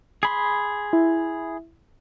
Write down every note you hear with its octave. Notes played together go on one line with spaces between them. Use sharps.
G#4 B5 C6
E4